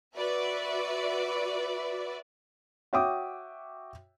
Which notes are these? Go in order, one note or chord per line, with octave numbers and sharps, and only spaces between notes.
F#4 B4 D5 E5
F#4 C#5 E5 G5 D6 D#6